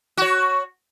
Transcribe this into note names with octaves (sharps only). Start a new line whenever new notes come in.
F#4 C#5